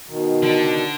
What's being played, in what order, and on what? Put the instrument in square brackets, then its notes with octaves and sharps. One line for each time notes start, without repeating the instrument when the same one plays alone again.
[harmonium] B2 D#3
[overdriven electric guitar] D3